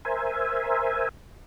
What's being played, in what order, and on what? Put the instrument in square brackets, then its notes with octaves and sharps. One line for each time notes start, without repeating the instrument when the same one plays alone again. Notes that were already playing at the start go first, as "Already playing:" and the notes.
[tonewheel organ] A#4 C5 E5 G#5